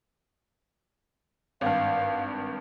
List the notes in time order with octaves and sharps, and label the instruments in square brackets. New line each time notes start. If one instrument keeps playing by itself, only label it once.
[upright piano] G#1 G2 [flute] F5